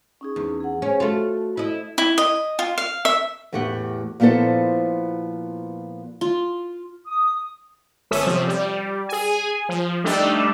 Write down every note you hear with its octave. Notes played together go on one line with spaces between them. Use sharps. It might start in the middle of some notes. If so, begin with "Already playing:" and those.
C#4 D#4 G#4
E2
G#4 F#5
C#4 G#4 C#5
A3 F4 F#4 A4
E4 D#5
E4
D#5
F4
F5
E5
E2 A2 A3 G4 F#5
A#2 F3 B3 E4 A4 C5
F4
D#6
G1 C#4 A4 E5 D#6 B6
C3 F3
G3
G#4 G#5
F3
G3 A3 D4 D#4 G4 A4